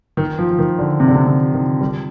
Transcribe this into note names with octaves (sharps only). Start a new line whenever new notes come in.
D#3
F3
F3
D#3
D3
C3
D3
C3
C3
D#3
G3